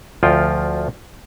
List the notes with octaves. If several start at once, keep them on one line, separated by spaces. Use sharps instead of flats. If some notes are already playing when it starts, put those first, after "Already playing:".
D2 F3 F4 G5